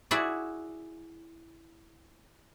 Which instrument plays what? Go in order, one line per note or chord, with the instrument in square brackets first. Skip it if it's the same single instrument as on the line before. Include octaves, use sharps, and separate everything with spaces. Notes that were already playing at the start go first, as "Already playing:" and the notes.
[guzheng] E4 F#4 G#4 D5